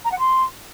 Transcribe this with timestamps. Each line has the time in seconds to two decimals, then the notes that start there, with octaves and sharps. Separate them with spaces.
0.05 A#5
0.12 F#5
0.19 C6